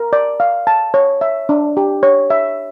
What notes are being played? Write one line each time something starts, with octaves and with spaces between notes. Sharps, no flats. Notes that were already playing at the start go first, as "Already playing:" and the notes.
Already playing: A#4
D5
F5
A5
C#5
E5
D4
G4
C#5
E5